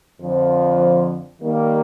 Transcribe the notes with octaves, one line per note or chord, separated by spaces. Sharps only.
F2 D3 F3
D#3 G3 A#3